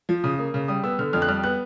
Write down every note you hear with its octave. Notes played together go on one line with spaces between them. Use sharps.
F3
C#3 D#6
A#3
C#3
G3 D#6
B3 E6
D3 F6
F2 F6
F#6
G3 F6
B3 F#6